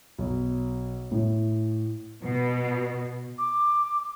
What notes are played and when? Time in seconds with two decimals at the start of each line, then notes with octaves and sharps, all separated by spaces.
0.19 B1
1.11 A2
2.23 B2
3.38 D6